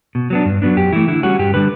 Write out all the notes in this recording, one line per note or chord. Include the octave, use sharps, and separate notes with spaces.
B2
F#3 B3 D4
G2
F#3 B3 D4
F#2 G4
E3 A3 E4
D3 E4
G3 C#4 F#4
G2 G4
D3 G3 B4